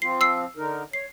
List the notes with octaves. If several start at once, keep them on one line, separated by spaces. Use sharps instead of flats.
F3 C4 F4 C7
E6 C7
D3 D#4 A#4
C#5 C7